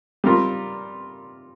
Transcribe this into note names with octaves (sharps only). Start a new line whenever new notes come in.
G3 C4 F4 A#4